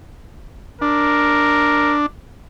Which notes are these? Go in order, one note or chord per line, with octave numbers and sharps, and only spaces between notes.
D4 A#4